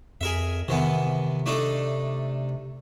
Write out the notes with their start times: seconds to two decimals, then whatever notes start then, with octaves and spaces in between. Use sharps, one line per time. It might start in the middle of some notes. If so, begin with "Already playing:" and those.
0.21 F2 G#4 A#4 E5
0.68 C3 D#3 E3 B3
1.46 A3 D4 D#4